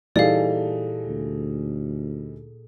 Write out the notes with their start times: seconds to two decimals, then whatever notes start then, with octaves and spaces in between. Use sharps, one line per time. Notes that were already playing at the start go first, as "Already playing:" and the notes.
0.16 A#2 E3 G3 D#4 G#4 A4 D5 F5
1.06 D2